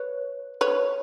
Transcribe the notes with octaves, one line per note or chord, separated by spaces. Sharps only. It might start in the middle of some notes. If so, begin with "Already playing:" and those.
Already playing: B4 C#5
B4 C#5